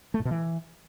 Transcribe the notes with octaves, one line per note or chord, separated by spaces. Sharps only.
A3
A2
B2
E3